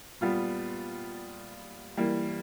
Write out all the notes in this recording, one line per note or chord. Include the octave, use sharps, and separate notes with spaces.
A#2 G3 B3 F4
E3 G3 A#3